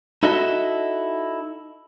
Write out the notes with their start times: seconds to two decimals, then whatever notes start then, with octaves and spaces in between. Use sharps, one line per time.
0.23 D#4 E4 F#4 A4 D#5 E5